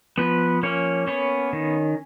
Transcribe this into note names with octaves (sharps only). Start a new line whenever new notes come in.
F3 B3 B4
A#3 C#4 C#5
B3 C#4 C#5
D#3